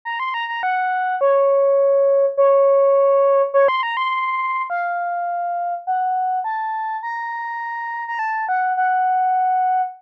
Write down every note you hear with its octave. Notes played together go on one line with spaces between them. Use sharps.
A#5
C6
A#5
A#5
F#5
C#5
C#5
C#5
C6
A#5
C6
F5
F#5
A5
A#5
A#5
A5
F#5
F#5